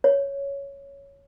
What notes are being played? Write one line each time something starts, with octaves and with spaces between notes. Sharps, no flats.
C#5